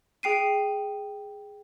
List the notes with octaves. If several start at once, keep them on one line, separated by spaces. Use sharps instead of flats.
G#4 G5 C7 D#7